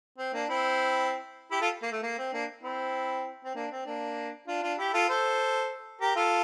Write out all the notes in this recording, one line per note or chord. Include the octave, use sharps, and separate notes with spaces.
C4
A#3 D4
C4 E4
E4 G4
F4 A4
A#3
A3
A#3
C4
A#3 D4
C4 E4
C4
A#3 D4
C4
A#3 D4
D4 F4
D4 F4
E4 G4
F4 A4
A4 C5
G4 A#4
F4 A4